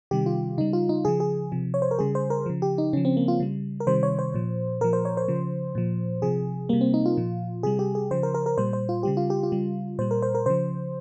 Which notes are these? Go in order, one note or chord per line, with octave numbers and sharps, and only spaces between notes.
C3 D#3 G3 G4
F4
C#3 G3 D#4
F4
D#4
C#3 F3 G#4
G#4
C3 F3
C#5
C5
A#4
C#3 G3 G#4
C5
A#4
C#3 F3
G4
D#4
C#3 F3 C#4
C4
A#3
F4
C#3 G3
A#4
C3 D#3 G3 C5
C#5
C5
A#2 F3
A#2 F3 A#4
C5
C#5
C5
C#3 F3
A#2 F3
C3 F3 G#4
C3 G3 A#3
C4
D#4
F4
A#2 F3
C3 G3 G#4
G4
G#4
C#3 F3 C5
A#4
A#4
A#4
A#2 G3 C5
C5
F4
C#3 G3 G4
F4
G4
F4
C#3 G3
A#2 G3 C5
A#4
C5
A#4
C#3 F3 C5